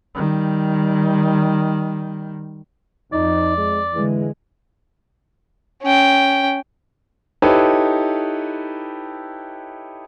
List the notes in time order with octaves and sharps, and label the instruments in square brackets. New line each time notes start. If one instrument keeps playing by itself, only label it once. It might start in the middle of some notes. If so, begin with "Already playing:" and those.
[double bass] D#3 G3
[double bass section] F2 [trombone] D#4 [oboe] D5
[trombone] G#3
[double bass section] D3 G#3 [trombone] E3
[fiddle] C#4 G5
[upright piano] D#4 E4 G4 A4 B4 C#5